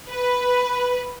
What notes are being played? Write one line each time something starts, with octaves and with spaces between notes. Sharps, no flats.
B4